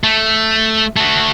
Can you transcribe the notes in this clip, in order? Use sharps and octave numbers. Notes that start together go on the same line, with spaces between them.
A3
A3 F#4